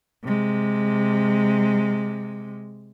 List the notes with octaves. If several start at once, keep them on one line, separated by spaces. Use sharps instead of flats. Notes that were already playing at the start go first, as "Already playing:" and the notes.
C3 G#3